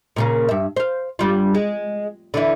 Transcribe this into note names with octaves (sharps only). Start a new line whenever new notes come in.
A#2 C#3 A#3
G2 E5
C5 F5
G2 G3 F4
G#3
D3 E3 E4